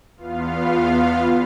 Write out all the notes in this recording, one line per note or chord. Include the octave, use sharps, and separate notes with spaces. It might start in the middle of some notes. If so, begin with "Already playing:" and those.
E2 B3 F4 F5